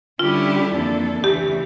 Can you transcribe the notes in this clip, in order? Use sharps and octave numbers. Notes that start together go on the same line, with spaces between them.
D3 G3 C#4 E4 F4 G4
F2 E3 A#3 D4 A4
D2 C#3 E3 G4